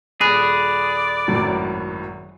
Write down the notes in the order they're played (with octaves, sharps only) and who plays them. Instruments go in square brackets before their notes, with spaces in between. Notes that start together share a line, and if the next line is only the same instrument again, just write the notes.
[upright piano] D#1 [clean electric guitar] G#4 [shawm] D5 [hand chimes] B5 F#6 A#6
[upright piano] G#1 F#2 A2